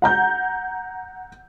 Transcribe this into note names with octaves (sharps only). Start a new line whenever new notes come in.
F#5 A#5 G6